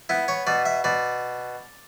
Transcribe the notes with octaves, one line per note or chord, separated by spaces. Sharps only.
B3 E4
C#5
B2 D5
E5
B2 D5